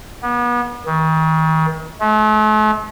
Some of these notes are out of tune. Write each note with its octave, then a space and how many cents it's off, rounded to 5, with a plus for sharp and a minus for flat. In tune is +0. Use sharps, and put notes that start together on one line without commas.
B3 -35
D#3 +40
A3 -45